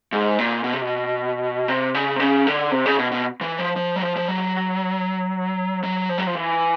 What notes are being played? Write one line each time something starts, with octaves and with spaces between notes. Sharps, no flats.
G#2
A#2
B2
C3
B2
C3
C#3
C3
C#3
D3
C3
C#3
B2
B2
E3
F3
F3
F#3
F3
F3
F#3
F#3
F3
F#3
F3
E3